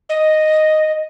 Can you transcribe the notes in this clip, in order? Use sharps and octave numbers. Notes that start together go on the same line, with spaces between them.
D#5